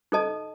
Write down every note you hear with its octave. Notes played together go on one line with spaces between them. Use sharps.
D#4 A4 D#5 A5